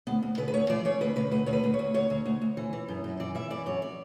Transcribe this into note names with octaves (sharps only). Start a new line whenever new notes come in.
D2 B3
D2
C#3 B4
B4
D2 C#5
E3 D5
E3 C#5
D2 B4
C#3 B4
D2 B4
D2 C#5
B4
D2
C#5
D2
D2 C#5
D2
D2
D2
E3
E3
F#2
F#2
E3 D5
E3 E5
E3 D5
F#2 C#5
D5